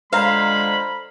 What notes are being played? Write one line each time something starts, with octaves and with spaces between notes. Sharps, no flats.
D3 F3 G#3 C5 F5 A#5 B5